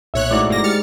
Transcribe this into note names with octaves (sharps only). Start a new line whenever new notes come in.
B1 A#2 C#5 E5 F#6
G#2 A3 E4 F#4 D5 D6
G1 A#3 A#6
G#3 G4 F6 A6 C#7